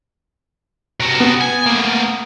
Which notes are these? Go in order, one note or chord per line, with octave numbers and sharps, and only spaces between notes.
C3 F#4
B3
G#5
A3 A#3